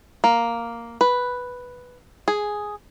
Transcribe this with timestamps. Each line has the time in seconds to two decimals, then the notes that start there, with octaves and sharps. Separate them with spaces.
0.24 A#3
1.01 B4
2.28 G#4